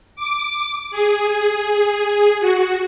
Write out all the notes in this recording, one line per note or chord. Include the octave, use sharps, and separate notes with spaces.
D6
G#4
F#4